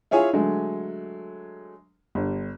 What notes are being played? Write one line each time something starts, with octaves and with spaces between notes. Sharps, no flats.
E4 F4 G#4 C#5 G#5
D3 F#3 G#3 A3
G1